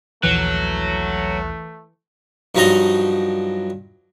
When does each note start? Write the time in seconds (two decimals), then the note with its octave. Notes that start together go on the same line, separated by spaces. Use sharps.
0.23 A#1 D#2 E3 F#3 A3 F#6
2.55 G2 F3 F#3 D#4 D#5 A#5